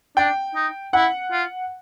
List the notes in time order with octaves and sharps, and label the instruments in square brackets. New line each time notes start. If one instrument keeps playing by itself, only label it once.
[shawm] D4 [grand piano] G5
[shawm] D#4
[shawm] E4 [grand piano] F#5
[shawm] F4